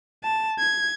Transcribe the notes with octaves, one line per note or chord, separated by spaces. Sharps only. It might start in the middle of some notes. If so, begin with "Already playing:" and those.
A5
G#6